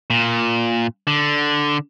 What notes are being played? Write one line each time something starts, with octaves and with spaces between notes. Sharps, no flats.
A#2
D3